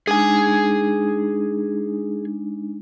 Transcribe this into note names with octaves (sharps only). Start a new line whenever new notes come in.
G#3 D4 D#4 G#4 G#5